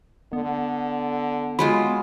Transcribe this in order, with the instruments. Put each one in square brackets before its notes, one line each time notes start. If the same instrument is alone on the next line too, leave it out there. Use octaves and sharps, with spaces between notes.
[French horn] D3 [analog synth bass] B3
[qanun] F#3 G#3 F4 [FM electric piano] B5